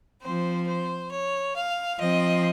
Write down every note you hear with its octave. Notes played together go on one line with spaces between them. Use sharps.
F3 C4 C5
C5
C#5
F5
F3 C4 D#5